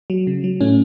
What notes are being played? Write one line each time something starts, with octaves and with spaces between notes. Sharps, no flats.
F#3
C#3
F#3
A2 A3 C#4